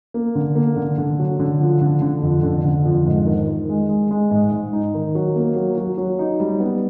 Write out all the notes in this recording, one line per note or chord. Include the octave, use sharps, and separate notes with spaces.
A#3
D3
A#3
D3
D3
F#3
D3
F3
D3
D3
F2
D3
D3
F2
G#2
D#3
D#3
G#3
G#3
G#3
G#2
G#2
D#4
D#3
F#3
A#3
F#3
F#3
F#3
D#4
G3
B3